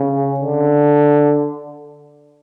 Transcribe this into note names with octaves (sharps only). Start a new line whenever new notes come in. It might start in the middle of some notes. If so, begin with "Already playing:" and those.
Already playing: C#3
D3